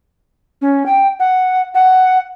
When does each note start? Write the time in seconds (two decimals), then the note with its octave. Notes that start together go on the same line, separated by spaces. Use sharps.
0.61 C#4
0.86 G5
1.19 F#5
1.74 F#5